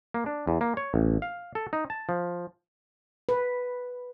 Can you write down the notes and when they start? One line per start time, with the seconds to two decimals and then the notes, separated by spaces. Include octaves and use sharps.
0.14 A#3
0.26 D4
0.47 E2
0.61 A#3
0.77 C#5
0.94 A1
1.22 F5
1.55 A4
1.73 D#4
1.90 A5
2.09 F3
3.29 B4